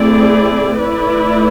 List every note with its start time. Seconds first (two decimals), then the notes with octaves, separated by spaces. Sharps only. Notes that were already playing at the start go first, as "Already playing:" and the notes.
Already playing: A3 C4 E4 G#4 D5
0.76 A3 E4 B4 D5